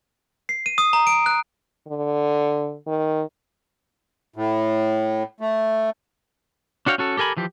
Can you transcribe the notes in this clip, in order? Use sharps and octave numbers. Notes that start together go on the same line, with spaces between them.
C7
D#7
D#6
A#5
D7
F#6
D3
D#3
A2
A3
D4 F#4 C#5 F5 G5
C#4 F#4 A4
G4 A4 A#4 G#5 B5
E3 F3 G4